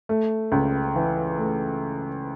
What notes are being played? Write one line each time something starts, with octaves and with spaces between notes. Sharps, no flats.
A3
C#2
E3
A3